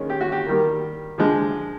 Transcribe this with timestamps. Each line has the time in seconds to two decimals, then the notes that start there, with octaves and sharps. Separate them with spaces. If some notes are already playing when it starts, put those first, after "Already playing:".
Already playing: D#3 G#3 C#4
0.10 G4
0.21 F#4
0.32 G4
0.46 D#3 G3 A#3
1.18 D3 F3 G#3